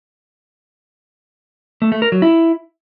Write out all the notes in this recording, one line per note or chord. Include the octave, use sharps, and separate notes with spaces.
A3
A3
A#4
F#3
E4